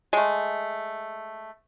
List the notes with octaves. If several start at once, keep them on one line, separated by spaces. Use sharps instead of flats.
G#3 A3